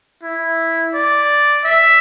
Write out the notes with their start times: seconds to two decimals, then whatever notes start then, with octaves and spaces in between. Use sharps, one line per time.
0.23 E4
0.94 D5
1.65 E5